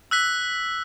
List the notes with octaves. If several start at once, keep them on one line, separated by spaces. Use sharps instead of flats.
E6 F#6 B6